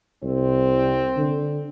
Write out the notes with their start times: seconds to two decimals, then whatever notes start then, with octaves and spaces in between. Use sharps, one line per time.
0.23 C2 C4
1.16 D3